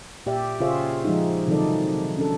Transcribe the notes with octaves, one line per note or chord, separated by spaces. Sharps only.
A#2 G4 D5 E5
C#3 F4 G#4 C5 C#5 E5
F3 G#3 D#4
C3 D#3 F#3 D#4 A4 D5
C#4 D4 A4